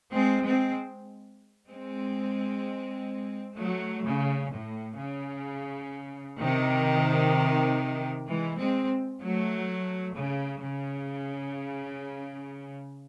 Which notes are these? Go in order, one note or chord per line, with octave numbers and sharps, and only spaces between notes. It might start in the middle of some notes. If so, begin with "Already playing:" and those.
G#3 C4
G#3 C4
G#3 C4
F#3 A3
C#3
A2
C#3
C3 D#3
E3 G#3
G#3 C4
F#3 A3
C#3
C#3